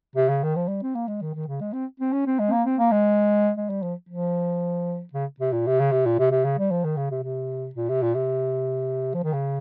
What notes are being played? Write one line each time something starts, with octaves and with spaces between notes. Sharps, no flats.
C3
C#3
D#3
F3
G3
C4
A#3
G#3
D#3
D#3
C#3
G#3
C4
C4
C#4
C4
G#3
C4
A#3
C4
A#3
G#3
G#3
G3
F3
F3
C#3
C3
A#2
C3
C#3
C3
A#2
C3
C3
C#3
G3
F3
D#3
C#3
C3
C3
A#2
C3
A#2
C3
F3
D#3
C#3